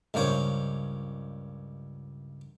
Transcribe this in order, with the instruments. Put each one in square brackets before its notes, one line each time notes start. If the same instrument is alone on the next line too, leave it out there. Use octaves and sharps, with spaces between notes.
[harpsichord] C#2 G2 A#3 C5 C#5